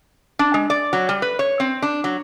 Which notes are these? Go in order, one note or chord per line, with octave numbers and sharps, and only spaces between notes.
D4
G#3
D5
F#3
G3
B4
C#5
C4
D4
F#3